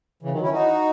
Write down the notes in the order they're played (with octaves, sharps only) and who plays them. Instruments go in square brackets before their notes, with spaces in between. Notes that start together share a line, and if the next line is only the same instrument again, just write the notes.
[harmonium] C#3 E3
D#3 F#3
C#4 E4
D#4 F#4